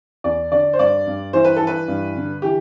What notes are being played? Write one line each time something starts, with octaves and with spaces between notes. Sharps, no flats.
E2 D5
D3 D5
C5
G2 D5
G2
E3 C5
B4
E3 A4
B4
G2
D3
E3 G4